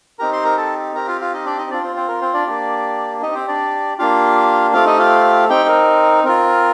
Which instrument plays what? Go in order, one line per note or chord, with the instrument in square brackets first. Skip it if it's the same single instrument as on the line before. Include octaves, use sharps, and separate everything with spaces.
[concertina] C4 D#4 G4 A#4 A#5
C5 C6
A#4 A#5
A4 A5
C4 G4 A#4 A#5
F4 F5
F4 F5
D#4 D#5
D4 D5
D#4 D#5
C4 D4 F4 D5
C4 C5
C4 C5
A#4
C4 C5
D4 D5
A#3 D4 G4
C4 D#4 G4 D#5
C4 C5
D4 D5
A#3 D4 F4 G4 F5
A3 C4 F4 G4 F5
D#4 D#5
F4 F5
C4 D#4 G4 G5
A#4
C4 F4 A#4